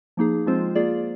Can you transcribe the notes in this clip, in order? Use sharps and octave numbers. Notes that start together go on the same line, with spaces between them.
F3 A#3 D#4 G#4
F3 G#3 C4 F4 C5
A#3 F4 G#4 D5